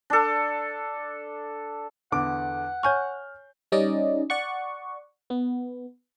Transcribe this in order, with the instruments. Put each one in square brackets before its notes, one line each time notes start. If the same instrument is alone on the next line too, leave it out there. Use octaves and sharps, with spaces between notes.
[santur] D4 A4
[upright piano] E2 D3 D6 [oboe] F#5
[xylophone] C#5 G#5 C#6 [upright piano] F6 G6
[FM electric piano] G3 C#4 D#4 D5 D#5
D5 F#5 C#6
B3